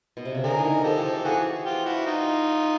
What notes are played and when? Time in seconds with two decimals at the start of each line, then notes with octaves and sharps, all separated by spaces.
0.17 B2
0.25 C3
0.35 C#3
0.44 D3 G#4 A#4
0.59 E3
0.64 D#3
0.84 F3 G4 A4
0.98 E3
1.05 F3
1.25 E3 F#4 G#4
1.65 F4 G4
1.85 E4 F#4
2.06 D#4 F4